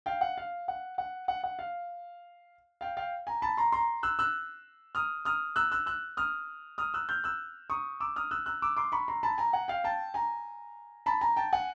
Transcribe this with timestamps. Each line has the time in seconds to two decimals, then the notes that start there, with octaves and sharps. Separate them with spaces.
0.06 F5 G5
0.21 F#5
0.38 F5
0.68 F#5
0.98 F#5
1.28 F#5
1.44 F#5
1.59 F5
2.81 F5 G5
2.97 F5 G5
3.27 G#5 A#5
3.42 A5 B5
3.58 A#5 C6
3.72 A#5 C6
4.03 E6 F#6
4.19 E6 F#6
4.95 D#6 F6
5.25 D#6 F6
5.56 E6 F#6
5.72 E6 F#6
5.86 E6 F#6
6.17 D#6 F6
6.78 D#6 F6
6.94 E6 F#6
7.09 F6 G6
7.24 E6 F#6
7.70 C#6 D#6
8.00 D6 E6
8.16 D#6 F6
8.31 E6 F#6
8.46 E6 F#6
8.62 D6 E6
8.77 C6 D6
8.92 B5 C#6
9.08 A#5 C6
9.23 A5 B5
9.38 G#5 A#5
9.53 F#5 G#5
9.68 F5 G5
9.84 G5 A5
10.14 G#5 A#5
11.06 A5 B5
11.21 G#5 A#5
11.37 G5 A5
11.53 F#5 G#5